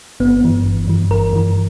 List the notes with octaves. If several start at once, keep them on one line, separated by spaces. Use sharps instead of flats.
G1 B3
G2 E3
G1
G2 E3
G1 A#4
G2 E3